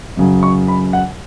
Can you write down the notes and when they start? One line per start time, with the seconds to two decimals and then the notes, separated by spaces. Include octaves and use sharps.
0.17 F#2 C#3 F#3
0.43 C#6
0.68 B5
0.93 F#5